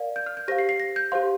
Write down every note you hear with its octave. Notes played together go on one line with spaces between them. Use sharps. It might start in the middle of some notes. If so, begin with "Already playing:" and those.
Already playing: A#4 D5 F5
G6
F6
G6
G4 C5 F5 A#6
C7
C7
A#6
G6
G4 C5 F5 C6